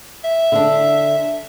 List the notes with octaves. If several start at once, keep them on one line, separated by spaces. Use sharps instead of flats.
E5
D3 D4